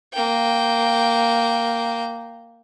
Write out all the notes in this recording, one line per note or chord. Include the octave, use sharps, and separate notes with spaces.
A#3 G5